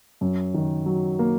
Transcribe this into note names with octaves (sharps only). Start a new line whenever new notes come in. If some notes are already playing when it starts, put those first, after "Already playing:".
F#2
D#3
F#3
A#3